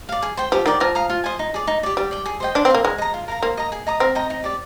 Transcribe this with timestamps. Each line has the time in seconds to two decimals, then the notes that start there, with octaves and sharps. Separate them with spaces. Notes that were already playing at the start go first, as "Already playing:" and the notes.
0.09 D5 F5
0.22 G#4
0.37 C5 G5
0.52 F3 G4
0.66 D#3 D5 G5
0.80 F3 A#4
0.95 F5 A#5 D#6
1.10 F4
1.24 C5 D#5 G#5
1.39 D#4
1.54 G#4 D5
1.67 D#4
1.83 G4 D5
1.97 G3 G4
2.11 D5 G5
2.26 G#4
2.40 C5 D#5 G5
2.55 D4 C5
2.65 C4
2.70 A#3 F5 C6
2.85 G#3 A#4
2.98 D#5 A#5
3.14 F4
3.28 A#4 F5 A#5
3.43 A#3 C5
3.57 D#5 A#5
3.72 G#4
3.87 D#5 A#5 D#6
4.00 C4 A#4
4.15 D#5 G5 A#5
4.30 D#4
4.44 G4 D5